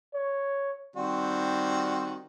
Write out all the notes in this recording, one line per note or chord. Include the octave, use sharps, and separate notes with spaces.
C#5
D#3 G3 C4 F#4